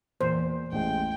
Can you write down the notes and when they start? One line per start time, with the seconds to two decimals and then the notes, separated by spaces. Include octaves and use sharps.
0.21 E2 A#2 C5
0.72 A1 G#3 G5